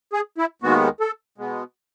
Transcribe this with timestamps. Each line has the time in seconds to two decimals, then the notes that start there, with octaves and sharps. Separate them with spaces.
0.13 G#4
0.38 E4
0.62 D#2 D#3 G#3 B3 F#4
1.00 A4
1.38 B2 G#3 B3